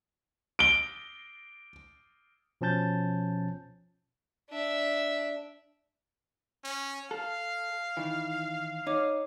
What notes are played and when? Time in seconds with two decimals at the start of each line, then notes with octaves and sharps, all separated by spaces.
0.59 D7 G7
2.61 B2 F3 C#4 A5 G6 A6
4.50 D4 E5
6.64 C#4
7.11 A4 F5
7.97 D#3 E3
8.87 D#4 C#5 D6